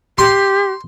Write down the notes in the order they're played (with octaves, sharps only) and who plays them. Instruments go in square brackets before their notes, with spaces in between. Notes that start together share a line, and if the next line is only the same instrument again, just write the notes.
[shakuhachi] G4 [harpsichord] C6